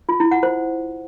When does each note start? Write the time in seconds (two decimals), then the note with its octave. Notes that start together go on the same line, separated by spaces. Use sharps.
0.09 F4
0.20 E4
0.31 F#5
0.43 C5